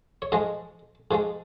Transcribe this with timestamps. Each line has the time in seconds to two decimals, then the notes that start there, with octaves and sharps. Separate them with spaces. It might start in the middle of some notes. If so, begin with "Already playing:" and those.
0.22 C#5
0.32 G#2 F3 G#3 D#5
1.11 G#2 F3 G#3